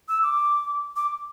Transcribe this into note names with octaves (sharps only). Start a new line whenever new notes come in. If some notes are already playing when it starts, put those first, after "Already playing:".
E6
D6
D6